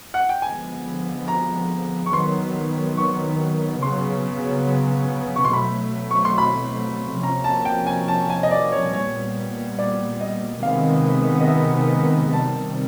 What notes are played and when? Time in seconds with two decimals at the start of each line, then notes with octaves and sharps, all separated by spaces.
0.14 F#5
0.29 G5
0.42 D3 F3 G#3 B3 G#5
1.28 A#5
2.06 C#6
2.13 D#3 F#3 B3 C6
2.98 C#6
3.82 C#3 F#3 B3 C6
5.36 C#6
5.45 C6
5.53 B2 F#3 A3 B5
6.11 C#6
6.25 C6
6.38 B5
7.23 C3 F3 A#3 C#4 A#5
7.44 A5
7.65 G5
7.86 G#5
8.08 A5
8.30 G#5
8.43 D#5
8.51 D5
8.72 C#5
8.93 A#2 G3 B3 C#5
9.79 D5
10.21 D#5
10.63 C3 D#3 G#3 B3 F5
11.41 D#5
11.48 E5
12.33 C3 D#3 G3 A5